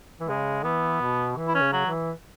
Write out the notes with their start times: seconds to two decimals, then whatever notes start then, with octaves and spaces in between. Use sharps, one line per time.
0.20 E3
0.28 C#3 G#3
0.64 E3 B3
1.01 B2
1.37 E3
1.48 E4
1.55 C#4
1.61 C#3
1.73 F#3
1.86 E3